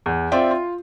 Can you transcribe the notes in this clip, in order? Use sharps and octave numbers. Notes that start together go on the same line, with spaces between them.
E2
C4 F4 D5 E5 G5
F4